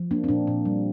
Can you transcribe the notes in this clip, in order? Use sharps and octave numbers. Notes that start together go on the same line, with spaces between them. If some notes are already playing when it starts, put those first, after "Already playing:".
Already playing: F3
A#3 D4
C4
A#2 D4
A#2
G3